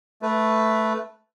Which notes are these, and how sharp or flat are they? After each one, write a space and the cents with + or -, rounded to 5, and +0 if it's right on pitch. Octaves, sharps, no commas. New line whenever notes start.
A3 +0 B4 +0